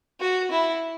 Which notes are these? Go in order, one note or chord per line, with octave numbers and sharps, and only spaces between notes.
F#4
E4